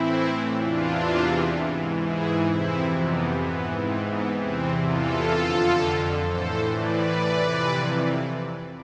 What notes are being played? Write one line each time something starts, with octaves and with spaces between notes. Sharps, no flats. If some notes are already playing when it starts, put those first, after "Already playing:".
Already playing: A2 E3 C4 E4
E2 C3 E3 D4 F4
G#2 E3
E4 G#4
F2 C3 E3 C4 E4
B3
G#2 E3 B3
C4
B3
E2 C3 E3 C4
F4 A4
F2 D3
A2 E3 A4 C5
B4 D5
F2 C3 E3